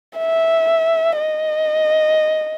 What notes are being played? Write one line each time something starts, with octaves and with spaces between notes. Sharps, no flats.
E5
D#5